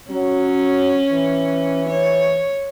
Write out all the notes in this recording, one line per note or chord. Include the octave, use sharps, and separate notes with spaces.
F#3 C#4
E3
C#5